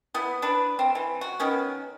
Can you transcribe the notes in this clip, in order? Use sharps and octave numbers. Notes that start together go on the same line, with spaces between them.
B3 E4
D4 B4
C4
E3
F#4
D#3 B3 C#4